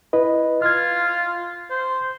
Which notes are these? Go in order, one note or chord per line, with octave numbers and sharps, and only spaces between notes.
E4 B4 D#5
F4 F6 G#6
C5